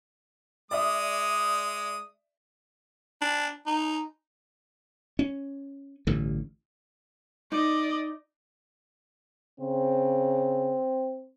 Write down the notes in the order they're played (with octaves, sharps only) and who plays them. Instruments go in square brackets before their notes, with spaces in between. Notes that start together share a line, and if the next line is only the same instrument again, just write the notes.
[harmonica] G#3 D#6 [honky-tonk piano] D5 E5
[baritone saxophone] D4
D#4
[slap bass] C#4
A1 G2 D3
[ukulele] D#4 [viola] D5 D#5
[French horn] C#3 [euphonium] C4